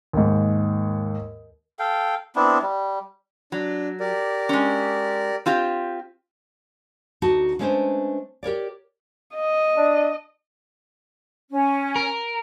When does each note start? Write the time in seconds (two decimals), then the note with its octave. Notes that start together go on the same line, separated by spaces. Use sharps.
0.13 D#2 G#2
1.79 A4 F5 G5
2.36 B3 C4 D4 E4
2.62 G3
3.52 F#3 D4
4.00 G4 A#4 D5
4.49 G#3 C#4
5.46 C4 F4 G4
7.22 D2 D#4 F#4 A5
7.59 G#3 A3 C#4 D4 B4 C5
8.43 G4 A#4 C#5 D5
9.36 D#5
9.77 D4
11.51 C#4
11.96 A#4